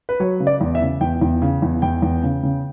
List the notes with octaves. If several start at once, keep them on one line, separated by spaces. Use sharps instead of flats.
B4
F#3 C#5
C#3
D5
E2
E5
C#3
E2 G5
E2
C#3
E2
E2 G5
E2
C#3
C#3